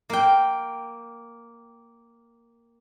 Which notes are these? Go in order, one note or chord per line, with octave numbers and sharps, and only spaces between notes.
A#3 G5